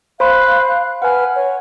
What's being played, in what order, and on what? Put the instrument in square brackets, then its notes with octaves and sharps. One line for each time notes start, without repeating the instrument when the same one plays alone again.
[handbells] C5 B5 C6 [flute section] F5 F#6
[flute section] B4 F6 [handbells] F#5 G#5
[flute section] C#5